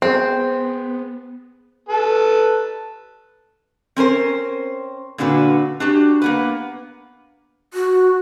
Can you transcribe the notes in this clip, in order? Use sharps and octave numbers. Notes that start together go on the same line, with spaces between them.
B3 C4 G#4 C5
A4 B4
C4 C#4 A#4 C5
A#2 D3 D4 F#4 B4
D4 F#4 G4
A#3 B3 B4
F#4